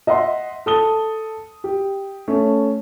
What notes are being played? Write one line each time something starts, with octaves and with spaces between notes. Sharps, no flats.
D#5 E5 F#5 C6
A4 D#6 G7
G4
A3 C#4